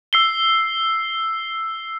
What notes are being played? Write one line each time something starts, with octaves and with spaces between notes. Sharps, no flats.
E6 C7 G7